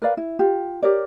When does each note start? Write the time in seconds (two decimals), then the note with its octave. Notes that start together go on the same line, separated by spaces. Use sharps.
0.02 A#4 B4 D5 F5
0.17 E4
0.39 F4 G4
0.83 G4 A#4 C#5 D5